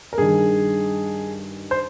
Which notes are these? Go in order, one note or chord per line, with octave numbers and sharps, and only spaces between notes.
A#4
G2 D#3 G#4
C5